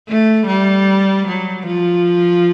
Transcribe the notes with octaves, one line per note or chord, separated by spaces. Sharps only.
A3
G3
F#3
F3